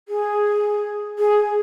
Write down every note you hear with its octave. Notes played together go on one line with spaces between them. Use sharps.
G#4
G#4